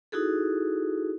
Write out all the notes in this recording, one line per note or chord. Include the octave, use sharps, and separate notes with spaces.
D#4 E4 F#4 G#4 A4